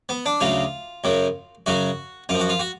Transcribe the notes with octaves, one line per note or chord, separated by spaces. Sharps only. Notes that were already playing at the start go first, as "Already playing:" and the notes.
B3
D4
D2 C#3 F#3 F4
F#2 C#3 F#3
F#2 C#3 F#3 F#4
F#2 F3 F4
F#4
F4
F#4